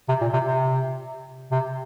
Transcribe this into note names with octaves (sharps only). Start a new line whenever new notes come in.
C3
A#2
C3
C3
C3